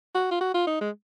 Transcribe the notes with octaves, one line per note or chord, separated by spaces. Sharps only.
F#4
F4
F#4
F4
D#4
G#3